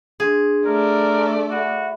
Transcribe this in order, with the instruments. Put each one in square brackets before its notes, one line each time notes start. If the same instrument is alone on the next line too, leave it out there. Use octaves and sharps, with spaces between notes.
[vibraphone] D4 C6 [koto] G#4
[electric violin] A3 D5 [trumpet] A#4
[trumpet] F#4 [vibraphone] E5 B5